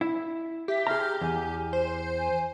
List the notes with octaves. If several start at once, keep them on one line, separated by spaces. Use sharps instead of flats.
E4
G4 E5
G#4 A#5 F6
E2 G#5
C5
G#5